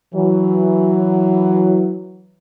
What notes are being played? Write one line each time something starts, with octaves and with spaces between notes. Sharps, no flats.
E3 F#3